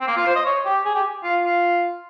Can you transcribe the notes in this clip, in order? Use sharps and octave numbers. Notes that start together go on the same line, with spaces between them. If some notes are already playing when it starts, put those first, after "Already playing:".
C4
A#3
F4
C5
D#5
C#5
G4
G#4
G4
F4
F4